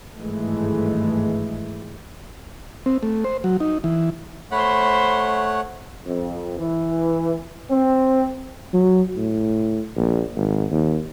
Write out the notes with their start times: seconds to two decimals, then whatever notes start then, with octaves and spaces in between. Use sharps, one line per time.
0.17 G#1 G2 E3 G#3 A3
2.86 C4
3.03 A3
3.24 C5
3.44 F#3
3.60 D#4
3.84 E3
4.52 A3 C5 C#5 F#5 B5
6.05 F2
6.58 E3
7.70 C4
8.73 F#3
9.16 A2
9.97 A#1
10.36 G#1
10.71 D#2